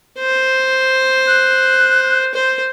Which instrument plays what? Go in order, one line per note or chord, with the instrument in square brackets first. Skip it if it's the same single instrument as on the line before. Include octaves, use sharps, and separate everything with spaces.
[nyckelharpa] C5
[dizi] F#6
[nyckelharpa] C5